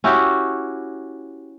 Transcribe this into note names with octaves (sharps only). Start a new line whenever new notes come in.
C#4 E4 F#4 G4